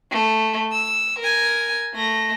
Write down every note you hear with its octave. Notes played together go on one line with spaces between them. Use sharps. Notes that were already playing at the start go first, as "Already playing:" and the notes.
A3
E6
A#4 G#5
A3 A#6